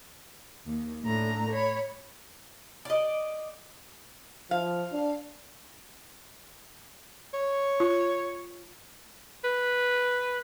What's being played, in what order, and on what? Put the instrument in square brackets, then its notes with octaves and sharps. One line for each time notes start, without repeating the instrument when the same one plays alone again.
[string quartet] D#2
A2 D3 A#5
C#5 B5
[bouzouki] D5 D#5
[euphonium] F3 [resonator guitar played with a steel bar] F5
[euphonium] D4
[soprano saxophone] C#5
[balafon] F4
[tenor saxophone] B4